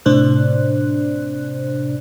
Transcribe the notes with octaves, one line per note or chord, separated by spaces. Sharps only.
A2 C3 D4 C5 D5 F#6